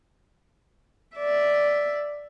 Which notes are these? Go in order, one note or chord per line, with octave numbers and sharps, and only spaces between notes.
D5 E5